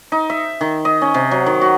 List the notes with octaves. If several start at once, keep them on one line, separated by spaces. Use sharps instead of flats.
D#4
E5
D#3
D#5
C#4
C3
F#3
D#3
F#4